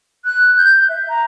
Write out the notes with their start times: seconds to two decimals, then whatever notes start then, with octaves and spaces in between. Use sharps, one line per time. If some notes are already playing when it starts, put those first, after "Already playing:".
0.24 F#6
0.57 G6
0.89 E5
1.08 A#5